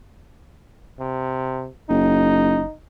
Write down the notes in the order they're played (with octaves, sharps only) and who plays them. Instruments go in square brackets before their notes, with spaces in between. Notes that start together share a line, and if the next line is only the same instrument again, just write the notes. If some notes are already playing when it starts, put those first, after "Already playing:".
[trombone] C3
[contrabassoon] F#1 [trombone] D#4